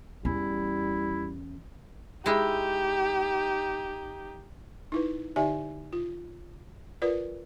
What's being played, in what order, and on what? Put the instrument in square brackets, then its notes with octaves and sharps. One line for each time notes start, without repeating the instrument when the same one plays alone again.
[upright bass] E2 C#4 [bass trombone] G3 [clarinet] E4
[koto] G#3 E4 [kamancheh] D#4 G4
[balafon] D#4 E4 B4
D3 D#4 G4 D5 E5 G#5
F4
F4 A#4 B4 D5